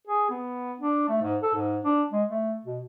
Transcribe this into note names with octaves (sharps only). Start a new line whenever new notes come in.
G#4
B3
D4
A3
G#2
A4
G#2
D4
G#3
A3
B2